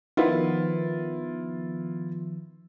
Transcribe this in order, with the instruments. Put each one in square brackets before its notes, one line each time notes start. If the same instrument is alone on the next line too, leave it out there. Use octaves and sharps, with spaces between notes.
[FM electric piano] D#3 F3 B3 [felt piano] E4 F4